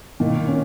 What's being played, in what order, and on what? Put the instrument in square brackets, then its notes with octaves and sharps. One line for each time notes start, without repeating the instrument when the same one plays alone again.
[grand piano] A#2 [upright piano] D#3
[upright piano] C#4